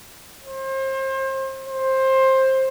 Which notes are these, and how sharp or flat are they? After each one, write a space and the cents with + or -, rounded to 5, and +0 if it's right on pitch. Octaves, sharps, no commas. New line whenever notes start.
C5 +35
C5 +15